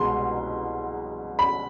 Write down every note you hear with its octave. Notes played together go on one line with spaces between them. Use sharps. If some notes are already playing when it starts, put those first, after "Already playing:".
Already playing: C2 B2 G#3 C6
B5